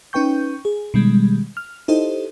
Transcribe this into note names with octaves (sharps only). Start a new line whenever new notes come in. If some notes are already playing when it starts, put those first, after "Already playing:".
C#4 D#4 B4 G5 C#6 G6
G#4
B2 D#3 G3 G#3
F6
D#4 E4 G4 A4 C5 D#5